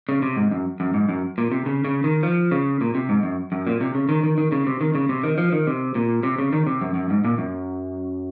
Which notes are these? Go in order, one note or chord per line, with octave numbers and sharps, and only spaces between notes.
C#3
C3
G#2
F#2
F#2
G#2
F#2
A#2
C3
C#3
C#3
D#3
F3
C#3
A#2
C3
G#2
F#2
F#2
A#2
C3
C#3
D#3
D#3
D#3
C#3
C3
D#3
C#3
C3
D#3
F3
D#3
C3
A#2
C3
C#3
D#3
C3
F#2
F#2
G#2
A#2
F#2